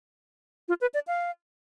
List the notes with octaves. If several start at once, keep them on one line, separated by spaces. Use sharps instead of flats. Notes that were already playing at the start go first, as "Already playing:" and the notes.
F4
B4
D5
F5